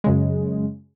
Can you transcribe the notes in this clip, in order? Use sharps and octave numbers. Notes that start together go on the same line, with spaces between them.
F#2 C#3 G#3